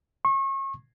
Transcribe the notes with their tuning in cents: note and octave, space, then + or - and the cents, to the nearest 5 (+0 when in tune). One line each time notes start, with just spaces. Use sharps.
C#6 -35